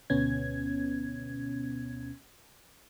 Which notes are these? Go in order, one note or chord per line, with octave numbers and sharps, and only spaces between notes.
D2 B2 B3 C#4 G#6